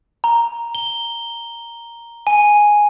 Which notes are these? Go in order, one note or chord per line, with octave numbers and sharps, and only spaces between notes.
A#5
G7
G#5